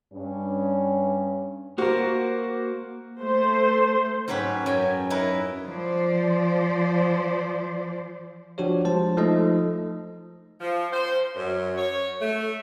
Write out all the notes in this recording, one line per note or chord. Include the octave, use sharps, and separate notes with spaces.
G2 C#4
A#3 F#4 A#4 C5
A3 C5
G#2 F#3 C#4 G4 B4
F#2 F#3 G5 G#5
D#4 E4 A#4 B4
F3 C5 D5
F3 D4 F#4 G4 C#5
F3 G#3 C5 A5
F3 A3 D#4 A4 D#5
F3
C5
F#2
C#5
A3